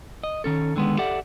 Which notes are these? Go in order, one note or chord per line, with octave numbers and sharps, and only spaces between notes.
D#5
D#3 C#4 A4
D3 D#3 G#3 B3
G4 A4 D5 E5 F#5